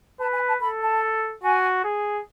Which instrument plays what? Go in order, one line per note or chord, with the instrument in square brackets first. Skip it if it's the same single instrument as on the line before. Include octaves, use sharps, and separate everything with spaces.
[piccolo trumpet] B4 [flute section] A5
[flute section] G#5
A5
[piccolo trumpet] A4 [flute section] B5
[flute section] A5
[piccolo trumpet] F#4 [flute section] G#5
[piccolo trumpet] G#4